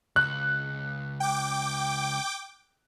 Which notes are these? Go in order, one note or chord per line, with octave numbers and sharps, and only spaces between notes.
C#2 F#6
G5 D6